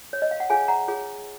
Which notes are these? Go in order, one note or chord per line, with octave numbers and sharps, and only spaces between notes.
C#5
D#5
F5
F#5
F4 G#4 C#5 F5 G#5
F#5 A#5
F4 G#4 C#5